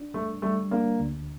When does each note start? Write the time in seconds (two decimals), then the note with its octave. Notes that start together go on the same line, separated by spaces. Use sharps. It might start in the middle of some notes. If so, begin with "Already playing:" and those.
Already playing: D4
0.14 G2 A3
0.42 G3 A3
0.71 A#3 D4
1.00 D2